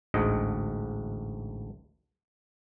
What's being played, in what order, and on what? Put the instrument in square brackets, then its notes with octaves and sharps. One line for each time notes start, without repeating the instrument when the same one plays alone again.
[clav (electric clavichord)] A1 D2 G#2 D#5